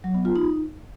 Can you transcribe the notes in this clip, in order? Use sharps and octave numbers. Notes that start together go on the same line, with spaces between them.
F#3
B3
F4
D#4